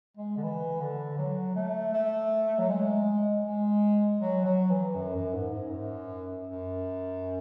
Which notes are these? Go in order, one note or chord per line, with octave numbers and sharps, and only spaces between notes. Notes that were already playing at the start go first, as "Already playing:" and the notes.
G#3
D3
E3
D3
F#3
A3
A3
F#3
G#3
G#3
F#3
F#3
E3
F#2
F#2
G#2
G#2
F#2
F#2